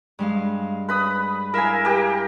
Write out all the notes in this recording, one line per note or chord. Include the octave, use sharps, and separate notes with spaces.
G2 G#3 F5
B4 B5 D#6
E4 A#4 E5 F5 G#5
G4 A#4